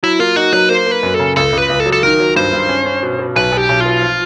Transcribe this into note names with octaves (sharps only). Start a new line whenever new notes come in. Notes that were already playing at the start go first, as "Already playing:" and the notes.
F#3 E4
A#3 F4
D#4 F#4
F#3 B4
A#3 C5
A#3 B4
F#2
A4
C#3
C#2 A4
C#2
B4
C#2
A4
F#3
A4
D#3 A#4
F#3
G2 C5
G2
C#4
C#4
B2
B2
B1 B4
B1
G4
B1
F4
B2
F3